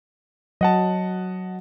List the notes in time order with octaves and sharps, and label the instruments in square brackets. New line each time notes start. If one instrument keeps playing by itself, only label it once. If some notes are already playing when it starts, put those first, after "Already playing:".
[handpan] F#3 [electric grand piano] D#5 F#5 A5